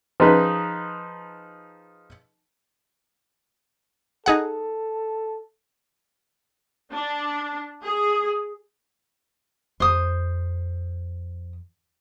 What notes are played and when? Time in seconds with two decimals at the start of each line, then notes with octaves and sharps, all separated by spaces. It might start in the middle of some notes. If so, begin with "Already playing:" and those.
0.20 F3 D#4 G#4 B4
4.26 D#4 G#4 A4 F#5
6.92 D4
7.82 G#4
9.80 F2 C5 D#6